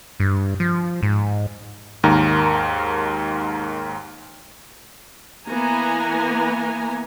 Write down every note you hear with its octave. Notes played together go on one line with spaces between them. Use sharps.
G2
F3
G#2
D#2 G#2 D#3 A#4 A#5
E3 A#3 B3 G#5 A#5